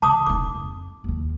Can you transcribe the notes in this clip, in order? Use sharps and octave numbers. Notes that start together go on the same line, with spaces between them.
C#3 E3 A5 D6 D#6
E1 D#4 D6
F2
D#2 D#3